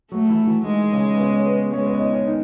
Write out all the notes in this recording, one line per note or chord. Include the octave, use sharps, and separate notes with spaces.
F#3 A3 F#4
E3 E4
F#4
E3 E4
D#3 G#3 D#4
C#3 C#4
B3
C#3 C#4
C#5
B3 B4
G#3 C#4 C#5
B3 B4
C#5
D#4 D#5
C#4 C#5
D#3 D#4